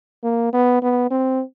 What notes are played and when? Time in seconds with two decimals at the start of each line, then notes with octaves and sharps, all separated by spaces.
0.24 A#3
0.53 B3
0.83 B3
1.11 C4